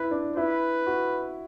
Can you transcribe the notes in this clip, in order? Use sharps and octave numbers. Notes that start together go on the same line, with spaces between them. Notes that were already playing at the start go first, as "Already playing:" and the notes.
Already playing: E4 B4
D4
E4 B4
F#4